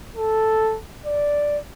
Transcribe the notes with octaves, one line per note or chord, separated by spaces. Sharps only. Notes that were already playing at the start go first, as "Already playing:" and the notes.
A4
D5